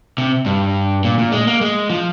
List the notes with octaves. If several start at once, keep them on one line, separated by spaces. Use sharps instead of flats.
C3
G2
A#2
A#2
G#3
A#3
G#3
F3